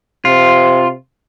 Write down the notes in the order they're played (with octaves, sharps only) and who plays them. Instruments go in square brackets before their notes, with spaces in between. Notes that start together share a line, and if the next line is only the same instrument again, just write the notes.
[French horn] C3 [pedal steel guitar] F4